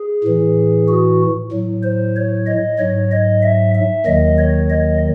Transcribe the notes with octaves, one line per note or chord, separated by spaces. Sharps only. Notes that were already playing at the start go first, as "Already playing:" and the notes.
Already playing: G#4
A2 E3
F#4
A2 F#3
C5
C#5
D#5
G#2 F#3 C#5
D#5
E5
E5
D#2 D#3 F#3 D#5
C#5
D#5